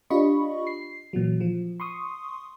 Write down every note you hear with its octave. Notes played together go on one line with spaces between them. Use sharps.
D4 F4 G4 D#5 B5 C#6
C7
A#2 E3 F#3
F3
C6 C#6 D#6